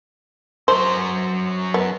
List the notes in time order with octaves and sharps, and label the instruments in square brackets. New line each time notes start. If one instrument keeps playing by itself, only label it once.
[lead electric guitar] F#2 F#3 [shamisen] C5
[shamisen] B3